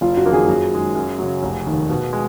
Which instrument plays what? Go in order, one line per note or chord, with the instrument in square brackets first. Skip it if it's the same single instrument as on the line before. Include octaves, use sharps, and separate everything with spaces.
[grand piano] F#1 [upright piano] F4
[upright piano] F#4
[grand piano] F2 D#3 A#3 D#4
[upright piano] G#4
[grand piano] F#2 [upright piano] F#4
[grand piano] D#3 G#3
F#2
C#3 F#3
F1
D#2 D#3
B2
G#3